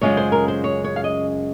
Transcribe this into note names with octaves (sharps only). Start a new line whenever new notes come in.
F#2 C#3 G#3 C#4 F4 C#5
C5
A#4
C5
C#5
C#5
F5
D#5